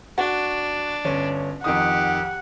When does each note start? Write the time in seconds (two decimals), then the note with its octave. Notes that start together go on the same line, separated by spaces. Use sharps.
0.18 D4 F#4
1.05 G1 C#4
1.64 F2 D#3 G4 F#5 D#6